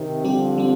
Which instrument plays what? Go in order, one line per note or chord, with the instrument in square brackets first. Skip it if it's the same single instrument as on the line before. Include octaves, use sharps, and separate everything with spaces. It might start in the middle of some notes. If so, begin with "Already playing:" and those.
Already playing: [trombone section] C3 D#3
[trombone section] D3 F3 [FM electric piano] G3 C4 G4
[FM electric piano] G3 C4